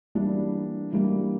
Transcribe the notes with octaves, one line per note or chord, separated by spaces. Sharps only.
E3 G3 A#3 D4
E3 G3 A#3 D4